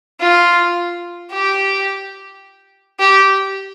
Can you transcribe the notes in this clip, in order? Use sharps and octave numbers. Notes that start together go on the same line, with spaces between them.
F4
G4
G4